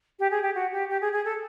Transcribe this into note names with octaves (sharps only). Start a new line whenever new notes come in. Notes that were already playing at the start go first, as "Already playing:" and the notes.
G4
G#4
G4
F#4
G4
G4
G#4
G#4
A4